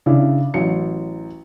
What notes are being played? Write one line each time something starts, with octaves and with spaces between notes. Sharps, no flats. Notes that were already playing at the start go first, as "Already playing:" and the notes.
C#3 D4 E4
A1 F#3 C#7